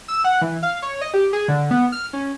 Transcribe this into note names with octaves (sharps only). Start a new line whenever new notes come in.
E6
F#5
E3
F5
C#5
D#5
G4
G#4
D3
B3
F6
C#4